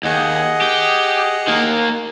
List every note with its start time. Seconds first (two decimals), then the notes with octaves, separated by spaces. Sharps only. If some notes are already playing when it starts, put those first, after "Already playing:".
0.04 D#2 G#4 D#5 F#5
0.61 G4
1.47 D#3 A#3